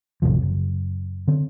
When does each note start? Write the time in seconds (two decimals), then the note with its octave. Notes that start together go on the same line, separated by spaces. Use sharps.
0.22 A1 F2 C3 F3
0.42 F#1
1.28 D3 C4